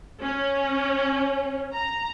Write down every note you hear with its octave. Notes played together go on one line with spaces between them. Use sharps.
C#4
A#5